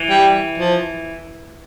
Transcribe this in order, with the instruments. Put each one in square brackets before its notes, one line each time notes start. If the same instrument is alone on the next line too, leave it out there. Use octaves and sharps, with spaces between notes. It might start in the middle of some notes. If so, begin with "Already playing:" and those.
Already playing: [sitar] E3
[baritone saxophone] G3
F3